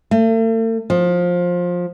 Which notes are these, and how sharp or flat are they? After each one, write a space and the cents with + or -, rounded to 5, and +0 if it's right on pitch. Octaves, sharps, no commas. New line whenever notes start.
A3 +40
F3 +20